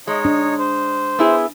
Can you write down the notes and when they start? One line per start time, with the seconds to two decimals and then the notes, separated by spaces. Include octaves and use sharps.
0.07 G#3 D#4 C#5
0.25 D4
0.59 C5
1.19 B3 E4 G#4